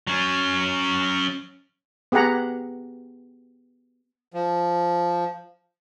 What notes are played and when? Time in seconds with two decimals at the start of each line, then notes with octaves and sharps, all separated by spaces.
0.07 F#3 C#4
2.12 B3 G4 G#4 F#5 A#5
4.34 F3